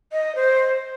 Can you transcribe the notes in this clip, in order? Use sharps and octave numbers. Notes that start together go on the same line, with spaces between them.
D#5
C5